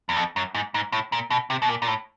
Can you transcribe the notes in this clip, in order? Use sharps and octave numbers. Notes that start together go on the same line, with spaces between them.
E2
F2
F#2
G#2
G#2
A2
A#2
B2
C3
B2
A#2
A#2
A2